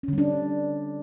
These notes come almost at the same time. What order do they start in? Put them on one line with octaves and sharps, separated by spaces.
C#4 D3 G3 D4